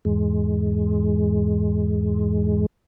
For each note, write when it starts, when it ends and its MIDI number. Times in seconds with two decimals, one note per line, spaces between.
0.05 2.66 40
0.05 2.66 44
0.05 2.66 56